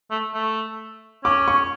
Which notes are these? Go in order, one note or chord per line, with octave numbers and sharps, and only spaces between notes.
A3
A3
C#4 D6
C#6